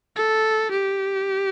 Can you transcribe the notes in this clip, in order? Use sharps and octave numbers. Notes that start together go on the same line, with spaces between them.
A4
G4